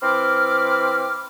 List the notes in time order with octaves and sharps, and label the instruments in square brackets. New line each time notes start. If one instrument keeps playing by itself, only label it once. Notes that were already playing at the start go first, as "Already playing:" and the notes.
[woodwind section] E3 C4 B5 D6 F6